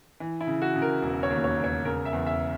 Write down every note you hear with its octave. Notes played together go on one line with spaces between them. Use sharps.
E3
E4
C#3
F#4
C#3
A#4
E1
C#5
D#2
C#5
E1
C#5
C#3 A#4
E5
E2
E5